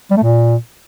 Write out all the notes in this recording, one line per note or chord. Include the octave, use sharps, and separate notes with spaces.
G3
A3
A#2